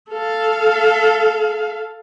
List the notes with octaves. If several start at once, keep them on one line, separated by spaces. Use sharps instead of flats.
A4 F5